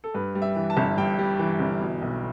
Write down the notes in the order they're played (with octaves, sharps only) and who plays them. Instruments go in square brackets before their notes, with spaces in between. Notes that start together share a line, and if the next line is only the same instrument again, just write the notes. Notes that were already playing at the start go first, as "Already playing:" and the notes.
[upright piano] A4
G2 B4
G3
E5
E3
A5
G1
G2 G5
G3
E3
G1
B2
B1